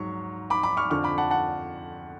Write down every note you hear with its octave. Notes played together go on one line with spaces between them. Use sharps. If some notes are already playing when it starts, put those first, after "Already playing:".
Already playing: G#2 F#3 C#6
B5 D6
B5 D6
C#6 F6
F2 D3 F3 C#6 F6
B5 D6
F#5 A5
F#5 A5